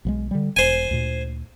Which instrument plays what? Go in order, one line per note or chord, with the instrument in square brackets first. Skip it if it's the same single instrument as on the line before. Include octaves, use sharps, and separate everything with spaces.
[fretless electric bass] B1 F3 G#3
D3 G3
[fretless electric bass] E1 [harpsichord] C5 G#5
[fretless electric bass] D2 A#2